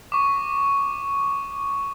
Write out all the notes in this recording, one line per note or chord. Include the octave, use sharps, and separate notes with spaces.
C#6 D6